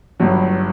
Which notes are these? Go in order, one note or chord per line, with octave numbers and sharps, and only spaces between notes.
G1 G2 F#3